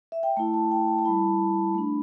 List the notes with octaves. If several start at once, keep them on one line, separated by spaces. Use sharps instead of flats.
E5
G5
A3 E4 A5
A5
G5
A5
A5
G3 E4 B5
A3 D4